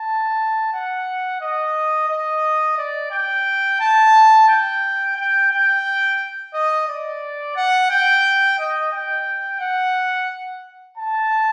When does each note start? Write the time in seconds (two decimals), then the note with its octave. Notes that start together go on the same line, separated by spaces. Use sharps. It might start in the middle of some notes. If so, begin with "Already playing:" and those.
Already playing: A5
0.73 F#5
1.41 D#5
2.09 D#5
2.78 D5
3.11 G5
3.80 A5
4.49 G5
5.17 G5
5.51 G5
6.54 D#5
6.88 D5
7.56 F#5
7.90 G5
8.59 D#5
8.93 G5
9.60 F#5
10.98 A5